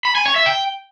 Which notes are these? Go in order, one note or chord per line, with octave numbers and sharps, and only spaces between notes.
B5
G#5
C#5
E5
G5